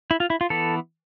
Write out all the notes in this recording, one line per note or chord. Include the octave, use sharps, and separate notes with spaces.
E4
F4
E4
F4
E3 B3 A4